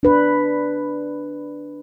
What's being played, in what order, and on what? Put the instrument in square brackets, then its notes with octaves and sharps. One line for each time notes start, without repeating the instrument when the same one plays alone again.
[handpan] D4 B4